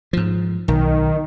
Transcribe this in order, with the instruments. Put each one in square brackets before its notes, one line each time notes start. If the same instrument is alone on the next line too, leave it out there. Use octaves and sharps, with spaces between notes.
[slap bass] G#2 F3
[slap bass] B1 [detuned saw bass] D#3